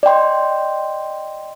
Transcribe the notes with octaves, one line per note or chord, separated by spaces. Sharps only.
D5 D#5 G5 C6